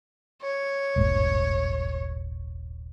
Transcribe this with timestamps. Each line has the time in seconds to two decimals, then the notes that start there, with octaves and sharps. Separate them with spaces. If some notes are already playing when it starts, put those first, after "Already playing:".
0.42 C#5
0.96 D#1 G#1 G2